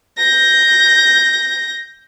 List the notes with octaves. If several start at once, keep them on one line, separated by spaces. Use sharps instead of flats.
G6 A#6